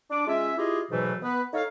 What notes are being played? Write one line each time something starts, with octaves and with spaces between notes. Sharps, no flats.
D4 D6
G#3 C#4 F4 E5
E4 F4 G4 G#4 D#5
G#2 B2 E3 F#3 A3 B4
B3 B4
D#4 A4 C#5 F5